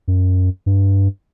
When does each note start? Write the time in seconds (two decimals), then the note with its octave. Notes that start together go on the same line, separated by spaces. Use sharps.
0.08 F#2
0.66 G2